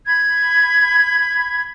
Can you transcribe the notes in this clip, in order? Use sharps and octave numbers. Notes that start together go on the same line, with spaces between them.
B5 G#6